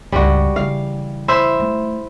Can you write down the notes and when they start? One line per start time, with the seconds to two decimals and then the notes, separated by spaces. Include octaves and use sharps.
0.12 C#2 G2 G3 F#4
0.56 C#3 E3 F5
1.28 E4 C5 E5
1.59 D#3 A3